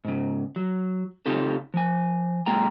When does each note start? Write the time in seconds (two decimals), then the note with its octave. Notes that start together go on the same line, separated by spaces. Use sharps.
0.05 G#2 C#3
0.56 F#3
1.26 C#3 C4 D#4 F4 G4 A4
1.74 F3 G#5
2.46 B1 G#3 A#3 G#4 G5 A#5